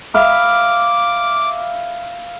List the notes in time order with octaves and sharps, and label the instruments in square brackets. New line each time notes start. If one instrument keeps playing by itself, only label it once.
[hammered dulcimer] E5 F5 B5 [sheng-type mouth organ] D6